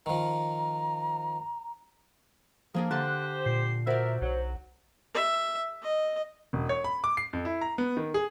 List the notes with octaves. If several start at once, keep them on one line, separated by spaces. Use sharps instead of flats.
D#3 F3 A#5
F3 A#3 D4 G#4 A#4
D3 G4 C5 A5 F#6
A#2 C7
F#4 A#4 C5 D5 E5
B1 F#3
E5
D#5
E1
C#5
B5
D6
C7
F2
E4
A#5
B3
D#3
G#4